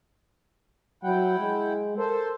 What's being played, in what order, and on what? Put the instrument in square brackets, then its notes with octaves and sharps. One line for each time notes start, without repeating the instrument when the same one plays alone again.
[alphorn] F#3 [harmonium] E4 F#5 G5
[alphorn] G#3
[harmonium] A4 C5 [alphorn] A#4